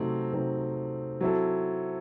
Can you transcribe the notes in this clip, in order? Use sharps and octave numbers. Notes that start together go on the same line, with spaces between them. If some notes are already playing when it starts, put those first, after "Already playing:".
Already playing: C3 F#3 A3 C4 D#4
C3 F#3 A3 C4 D#4
F#3 C4 E4 A4